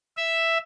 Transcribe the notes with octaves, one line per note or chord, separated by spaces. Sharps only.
E5